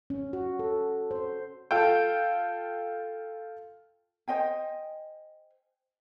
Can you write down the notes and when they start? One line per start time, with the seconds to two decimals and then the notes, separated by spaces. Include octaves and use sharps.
0.10 C#4
0.33 F#4
0.59 A4
1.11 C5
1.71 F4 A4 G5
4.28 C5 D#5 G5 G#5